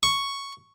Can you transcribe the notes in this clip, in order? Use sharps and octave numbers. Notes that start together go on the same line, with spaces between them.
C#6